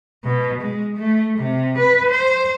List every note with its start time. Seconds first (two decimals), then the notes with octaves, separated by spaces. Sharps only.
0.25 B2
0.61 G#3
0.97 A3
1.38 C3
1.78 B4
2.10 C5